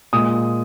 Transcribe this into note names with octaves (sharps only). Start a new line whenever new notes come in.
A#2 G#3 D#6